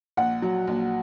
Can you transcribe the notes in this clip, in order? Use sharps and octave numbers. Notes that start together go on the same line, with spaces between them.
A#1 F#5
F#3
A#1